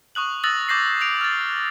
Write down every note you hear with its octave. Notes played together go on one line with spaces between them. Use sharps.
C#6 D#6 F#6 F#7
D#6 E6 F#6 A6 A#6 F#7
D6 G6 A#6 C7
D7 F7
F6 A6